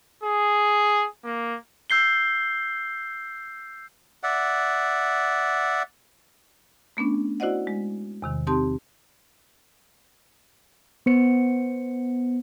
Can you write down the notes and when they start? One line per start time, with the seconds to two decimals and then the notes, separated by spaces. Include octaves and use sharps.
0.23 G#4
1.24 A#3
1.90 E6 G6 C7 G7
4.23 D5 E5 F#5
6.97 A3 B3 C#4 D4
7.40 E4 F#4 C5 D5 D#5 F#5
7.67 G#3
8.22 E2 C3 D#3
8.47 C4 D#4 G4 A5 C6
11.06 B3 C5 C#7